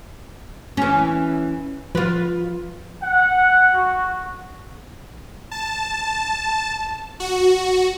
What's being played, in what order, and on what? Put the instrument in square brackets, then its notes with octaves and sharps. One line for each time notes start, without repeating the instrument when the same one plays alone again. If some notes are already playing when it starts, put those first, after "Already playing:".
[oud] E3 C#4
[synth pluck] F3 [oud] F4 B4
[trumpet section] F#5
F#4
[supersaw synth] A5
F#4